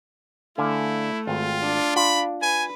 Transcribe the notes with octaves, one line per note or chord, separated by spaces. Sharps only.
D3 A3 E4 F5 G#5
G#1 F4
D4
F4 B5
B4 G#5